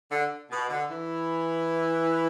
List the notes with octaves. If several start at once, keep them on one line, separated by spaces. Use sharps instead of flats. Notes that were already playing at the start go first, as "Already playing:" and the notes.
D3
B2
D3
E3